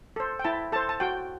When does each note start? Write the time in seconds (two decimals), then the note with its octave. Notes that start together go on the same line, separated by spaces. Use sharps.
0.16 A4 C5
0.39 G5
0.44 E4 A5
0.72 A4 C5 A5
0.89 A5
1.00 F#4 G5